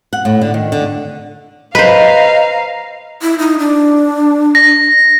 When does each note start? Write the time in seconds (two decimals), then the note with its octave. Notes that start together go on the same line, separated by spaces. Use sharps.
0.13 F#5
0.25 A2
0.41 D3
0.54 D#3
0.72 D3
1.75 B4 C5 D#5 F5 A#5
3.22 E4
3.39 D#4
3.59 D4
4.55 A#6